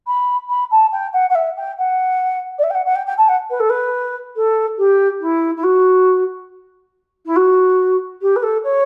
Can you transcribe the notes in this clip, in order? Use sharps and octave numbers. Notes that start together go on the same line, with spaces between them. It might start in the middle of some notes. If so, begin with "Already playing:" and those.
B5
B5
A5
G5
F#5
F#5
E5
G5
F#5
D5
E5
G5
F#5
F#5
G5
G5
A5
F#5
B4
A4
B4
A4
G4
E4
E4
F#4
E4
F#4
G4
B4
A4
C#5